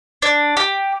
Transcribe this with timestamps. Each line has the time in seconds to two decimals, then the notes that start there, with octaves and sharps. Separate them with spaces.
0.22 D4
0.57 G4